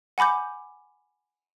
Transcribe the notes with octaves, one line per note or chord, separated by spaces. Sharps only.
F#5 G#5 B5 D6 G6